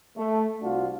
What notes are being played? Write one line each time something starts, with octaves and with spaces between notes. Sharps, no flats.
A3
C2 D4 F4 F#4